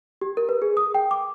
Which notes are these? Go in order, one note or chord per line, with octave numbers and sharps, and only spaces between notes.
G4
A#4
B4
G#4
D#6
G5
D6